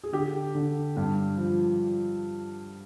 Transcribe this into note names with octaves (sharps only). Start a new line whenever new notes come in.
G#4
D3 G4
D3
G2
F3